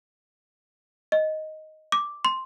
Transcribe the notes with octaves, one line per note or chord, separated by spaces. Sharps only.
D#5
D6
C6